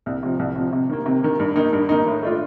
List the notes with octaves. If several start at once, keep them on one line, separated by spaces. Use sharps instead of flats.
C2
C3 F3
C2
C3 F3
C3
D#3 A#3
C3
D#3 A#3
G2
D#3 A#3 D#4
G2
D#3 A#3 D#4
A2
A3 D4 F4